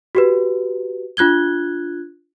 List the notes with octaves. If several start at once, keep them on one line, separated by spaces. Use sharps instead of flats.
F#4 G4 B4
D4 F4 F#6 G#6 G7